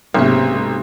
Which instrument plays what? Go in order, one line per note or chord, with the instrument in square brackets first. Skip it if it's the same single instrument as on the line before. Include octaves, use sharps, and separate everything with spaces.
[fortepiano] B1 C#4 [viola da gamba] G#2 C3 G#3 [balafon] A#3 B3 E5